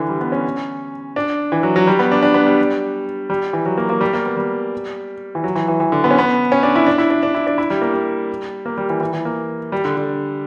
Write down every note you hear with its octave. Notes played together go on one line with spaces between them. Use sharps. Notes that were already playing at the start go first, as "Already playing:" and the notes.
Already playing: D3 E3
G3
B3
C#4
D4
E3
F#3
F#3
G3
B3
D4
D4
B3
G3
G3
E3
F#3
A#3
A#3
G3
A#3
B3
G3
E3
F#3
E3
E3
E3
D3
B3
C#4
B3
C#4
D4
E4
D4
E4
D4
D4
E4
D4
E4
G3
A#3
G3
A#3
G3
E3
E3
E3
A#3
G3
D3
D3